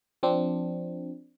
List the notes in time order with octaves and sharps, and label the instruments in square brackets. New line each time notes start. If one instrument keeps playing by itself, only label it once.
[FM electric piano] F3 C4 D4